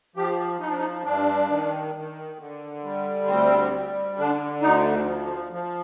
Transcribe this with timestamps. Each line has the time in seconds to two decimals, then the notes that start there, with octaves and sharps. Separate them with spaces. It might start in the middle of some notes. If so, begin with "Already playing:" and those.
0.16 F3 G4
0.60 F3 D#4
0.69 D4
0.78 D#4
1.05 G2 D4
1.49 D#3
1.95 D#3
2.39 D3
2.84 G3
3.28 D2 C4
3.72 G3
4.18 D3 D4
4.62 D2 D#4
5.06 F3
5.52 F3